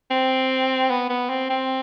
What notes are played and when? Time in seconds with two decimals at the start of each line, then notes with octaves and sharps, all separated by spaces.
0.11 C4
0.91 B3
1.10 B3
1.30 C4
1.50 C4